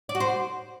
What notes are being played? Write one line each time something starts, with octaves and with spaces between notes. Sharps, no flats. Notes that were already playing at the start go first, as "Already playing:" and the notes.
D5
F#4
C5